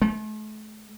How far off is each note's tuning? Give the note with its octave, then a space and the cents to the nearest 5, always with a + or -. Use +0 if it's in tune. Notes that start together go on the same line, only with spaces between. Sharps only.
A3 -40